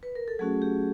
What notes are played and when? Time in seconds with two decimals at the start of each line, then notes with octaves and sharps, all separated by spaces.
0.03 B4
0.15 A#4
0.28 A4
0.39 F#3 A3 C#4 F#4 G#4
0.62 G4